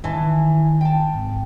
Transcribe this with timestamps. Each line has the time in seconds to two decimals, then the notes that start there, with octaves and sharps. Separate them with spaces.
0.04 D#3 E3 A5
0.81 G5 A5
1.13 G#1